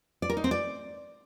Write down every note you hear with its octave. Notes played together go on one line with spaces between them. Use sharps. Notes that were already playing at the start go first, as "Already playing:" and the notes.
D5
A#4
D#4
C4
D5